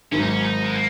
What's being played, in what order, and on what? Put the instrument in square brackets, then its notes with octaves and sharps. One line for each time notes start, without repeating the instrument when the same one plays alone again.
[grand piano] G#1 G#2 F#3 [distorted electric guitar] C#4
[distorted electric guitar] D#4
C#4
D#4
G#3
A#3